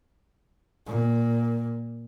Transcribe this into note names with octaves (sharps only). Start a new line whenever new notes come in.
A#2